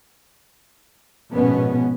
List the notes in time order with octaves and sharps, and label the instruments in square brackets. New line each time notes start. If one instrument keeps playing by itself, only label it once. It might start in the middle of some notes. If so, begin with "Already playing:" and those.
[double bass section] A#1 G#2 B2 B3 C#4